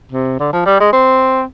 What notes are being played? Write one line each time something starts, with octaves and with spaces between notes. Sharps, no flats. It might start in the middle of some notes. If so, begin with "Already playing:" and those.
C3
D3
F3
G3
G#3
C4